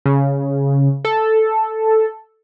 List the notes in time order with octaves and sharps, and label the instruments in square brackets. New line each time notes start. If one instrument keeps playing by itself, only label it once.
[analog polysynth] C#3
A4